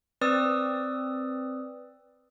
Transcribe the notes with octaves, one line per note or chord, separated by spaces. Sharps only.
C4 B4 D5 D#6 E6